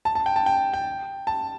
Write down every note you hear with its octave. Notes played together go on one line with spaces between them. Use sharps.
A5
A5
G5
A5
G5
G5
A5